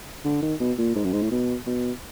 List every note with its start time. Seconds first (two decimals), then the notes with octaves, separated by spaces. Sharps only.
0.25 D3
0.42 D#3
0.60 B2
0.78 A#2
0.95 G#2
1.04 F#2
1.13 G#2
1.22 A2
1.31 B2
1.66 B2